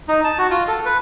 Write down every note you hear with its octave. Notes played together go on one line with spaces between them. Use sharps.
D#4
A5
F#4
F4
A4
B4